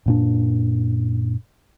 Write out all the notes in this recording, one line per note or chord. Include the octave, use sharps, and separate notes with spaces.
F#2 A#2 D4